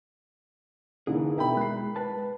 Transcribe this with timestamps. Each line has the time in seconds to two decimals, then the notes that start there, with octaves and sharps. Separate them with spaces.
1.07 D3 E3 A#3 D#4 E4 G#4
1.38 B2 D4 A#4 E5 G5 B5
1.57 G#3 F#6 C7
1.96 B4 A5